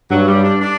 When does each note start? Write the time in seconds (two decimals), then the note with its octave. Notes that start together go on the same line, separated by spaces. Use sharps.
0.11 G2 F#3
0.28 G3
0.44 D4
0.61 D4